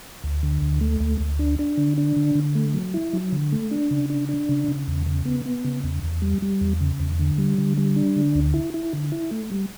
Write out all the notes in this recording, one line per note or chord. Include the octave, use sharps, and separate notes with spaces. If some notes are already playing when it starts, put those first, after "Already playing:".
D2
D3
D2
A3
D2
D2
D4
D4
D3
D4
D3
D3
A3
F#3
E4
F#3
D3
A3
D4
C#3
D4
D4
C#3
C#3
E2
C#3
B3
B3
C#3
E2
E2
G3
G3
E2
C#3
E2
D3
G3
D3
G3
D4
D3
D2
E4
E4
D3
E4
A3
G3